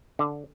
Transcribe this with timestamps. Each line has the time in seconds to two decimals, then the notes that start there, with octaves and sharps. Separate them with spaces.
0.19 D3